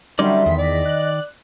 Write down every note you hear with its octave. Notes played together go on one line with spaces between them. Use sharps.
D3 F#3 G3 C#4 D#4 D5 E5 C6
E2 D#3 B6
D5 D#5
F#6